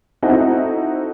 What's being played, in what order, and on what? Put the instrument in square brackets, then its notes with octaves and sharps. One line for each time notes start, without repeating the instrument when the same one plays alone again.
[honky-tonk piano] C4 D#4 E4 F#4 A4